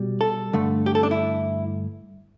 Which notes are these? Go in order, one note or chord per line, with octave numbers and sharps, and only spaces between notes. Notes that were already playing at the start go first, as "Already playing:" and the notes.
Already playing: B2 G3
A4
G2 D3 A3
G4
A4
D4
E4